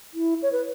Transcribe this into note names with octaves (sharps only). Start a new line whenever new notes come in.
E4
C#5
B4